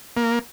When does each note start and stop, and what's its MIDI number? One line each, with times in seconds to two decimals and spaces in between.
0.17 0.39 58